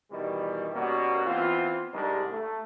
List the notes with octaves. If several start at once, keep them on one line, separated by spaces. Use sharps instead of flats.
B2 D#3 E3 G3
B2 G3 A#3 C#4 F#4
E3 B3 C4 F4
C2 G#2 G3 G#3 D4 A#4
A3